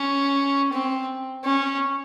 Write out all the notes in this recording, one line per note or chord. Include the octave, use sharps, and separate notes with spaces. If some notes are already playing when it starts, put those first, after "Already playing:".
Already playing: C#4
C4
C#4